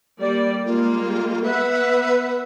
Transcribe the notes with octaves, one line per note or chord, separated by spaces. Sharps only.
G3 A#3 D5
G3 G#3 A#3 F4
B3 B4 E5 F#5